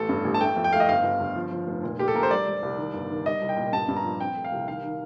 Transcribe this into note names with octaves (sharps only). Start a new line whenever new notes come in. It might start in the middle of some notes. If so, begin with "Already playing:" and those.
Already playing: A1 A4
G2
A1
A5
A3 G5
F2
G5
A3 F5
D#5
G1 F5
G1
G1
F3
F3
F1
A#2
A#2 G4
A4
A#1 A#4
C5
G3 D5
G3
C2
D#3
G1
D#3
G3 D#5
C2
G5
A#2
G2 A5
G2
A#5
F3
C4 G5
A3
F5
C2
D#3 F5
D#3